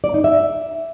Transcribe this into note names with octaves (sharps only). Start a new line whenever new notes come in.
D5
D#4
E5